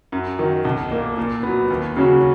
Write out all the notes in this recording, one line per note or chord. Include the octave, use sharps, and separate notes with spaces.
F#2
D#3 F#3
B1
A#2 A#3
A#2
F#3 B3
D#2
C#3 F#3 C#4 F#4